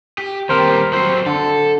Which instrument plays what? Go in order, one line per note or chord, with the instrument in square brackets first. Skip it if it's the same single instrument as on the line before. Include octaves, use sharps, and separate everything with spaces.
[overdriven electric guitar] G4
[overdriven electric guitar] D#2 G3 [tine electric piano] C4 A#4 C5
[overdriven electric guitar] F#3 C4 [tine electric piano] C5
[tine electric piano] D3 [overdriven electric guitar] A4